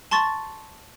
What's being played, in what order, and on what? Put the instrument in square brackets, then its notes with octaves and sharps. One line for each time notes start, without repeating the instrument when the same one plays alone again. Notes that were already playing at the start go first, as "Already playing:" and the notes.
[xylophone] A5 C6 C#6 A6